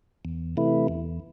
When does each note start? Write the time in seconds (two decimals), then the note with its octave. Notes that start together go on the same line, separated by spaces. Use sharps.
0.25 E2
0.57 C3 E3 A3 E4
0.88 E2